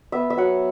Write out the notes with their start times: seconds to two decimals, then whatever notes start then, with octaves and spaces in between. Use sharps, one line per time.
0.12 B3 E5
0.30 E5
0.37 F#3 F#5